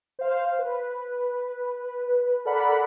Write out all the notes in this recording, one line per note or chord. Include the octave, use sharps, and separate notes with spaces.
C5 F5
B4
A4 A#4 D5 F#5 B5